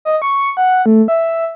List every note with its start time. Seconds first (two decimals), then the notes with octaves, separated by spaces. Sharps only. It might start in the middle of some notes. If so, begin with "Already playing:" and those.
0.05 D#5
0.22 C#6
0.57 F#5
0.86 A3
1.08 E5